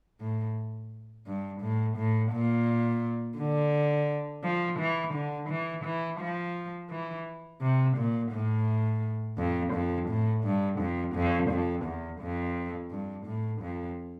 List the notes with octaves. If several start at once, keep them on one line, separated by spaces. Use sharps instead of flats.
A2
G2
A2
A2
A#2
D3
F3
E3
D3
E3
E3
F3
E3
C3
A#2
A2
F2
F2
A2
G2
F2
F2
F2
E2
F2
G2
A2
F2